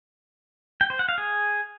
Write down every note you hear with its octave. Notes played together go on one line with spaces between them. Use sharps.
G5
C5
F#5
F5
G#4